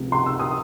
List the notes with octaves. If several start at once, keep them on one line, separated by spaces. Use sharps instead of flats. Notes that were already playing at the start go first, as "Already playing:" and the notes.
Already playing: C#2 C3 F3
C6
E6
D#6